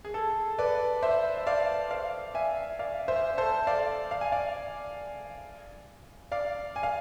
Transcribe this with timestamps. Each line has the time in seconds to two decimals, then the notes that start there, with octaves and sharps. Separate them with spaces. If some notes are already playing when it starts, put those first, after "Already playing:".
0.05 G#4
0.14 A4
0.58 B4 D5
1.03 C5 E5
1.37 E5
1.47 D5 F5
1.90 D5 F5
2.34 E5 G#5
2.79 D5 F5
3.08 C5 E5
3.38 A4 C5
3.67 D5 F5
4.11 F5
4.21 G#5
4.32 D5 F5
6.32 D5 F5
6.76 G#5
6.83 F5